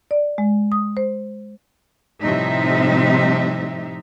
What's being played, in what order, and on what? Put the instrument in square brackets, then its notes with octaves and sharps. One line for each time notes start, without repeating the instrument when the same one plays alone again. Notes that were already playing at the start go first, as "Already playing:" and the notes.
[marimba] D5
G#3
D#6
C5
[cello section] A2 C3 F3 G3 D#4 E5